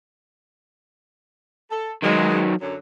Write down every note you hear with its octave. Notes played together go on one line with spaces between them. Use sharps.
A4
D#3 F#3 G#3
F#2 D3 F#3